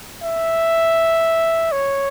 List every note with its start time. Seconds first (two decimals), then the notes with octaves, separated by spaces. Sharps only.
0.23 E5
1.72 C#5